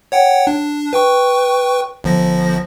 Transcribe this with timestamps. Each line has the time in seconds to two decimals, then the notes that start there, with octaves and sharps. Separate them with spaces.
0.12 C#5 F#5 G5
0.47 D4
0.93 B4 G5 C#6
2.04 G1 F3 A#6